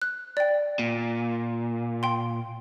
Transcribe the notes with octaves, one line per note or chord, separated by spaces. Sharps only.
F#6
D5 G5
A#2
G5 C6